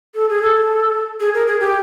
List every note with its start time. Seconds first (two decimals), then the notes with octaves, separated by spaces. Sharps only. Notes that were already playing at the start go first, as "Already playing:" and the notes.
0.15 A4
0.29 G#4
0.42 A4
1.20 G#4
1.34 A#4
1.47 G#4
1.60 G4